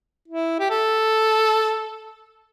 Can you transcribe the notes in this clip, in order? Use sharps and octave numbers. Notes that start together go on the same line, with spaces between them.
E4
G4
A4